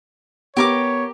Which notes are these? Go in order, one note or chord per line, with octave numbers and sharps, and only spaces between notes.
B3 G4 A#4 C#5 D6